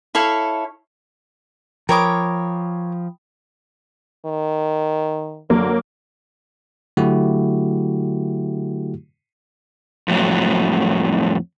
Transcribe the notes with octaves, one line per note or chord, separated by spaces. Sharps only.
E4 A4 C#5 F5
F3 A#4 C#5 G5 B5 D6 D#6
D#3
F#2 D3 F#3 A#3
D3 F#3 A3 E4 F#4 G4
F2 A2 F#3